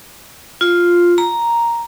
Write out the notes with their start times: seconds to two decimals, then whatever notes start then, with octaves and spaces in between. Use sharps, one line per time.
0.61 F4
1.18 A#5